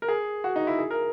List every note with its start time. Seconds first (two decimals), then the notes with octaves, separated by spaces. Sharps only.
0.02 A#4
0.08 G#4
0.44 F#4
0.56 D#4
0.67 E4
0.79 G#4
0.91 A#4